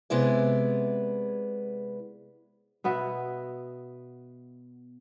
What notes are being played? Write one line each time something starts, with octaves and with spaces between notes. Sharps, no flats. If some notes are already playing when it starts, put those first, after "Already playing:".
C3 G#3 B3 E4 D5
B2 B3 F#4 E5